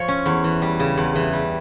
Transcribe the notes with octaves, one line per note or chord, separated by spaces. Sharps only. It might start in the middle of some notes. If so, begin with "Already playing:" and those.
Already playing: F3 F4 C#5
C#4
E2
E3
G3
C#3
E2
E3
G3